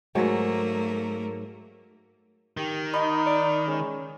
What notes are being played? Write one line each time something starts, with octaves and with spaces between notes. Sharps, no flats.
G#2 F#3 A3 A#3
D#3 G4
D#4 D#5 B5
D5
G#3 C#4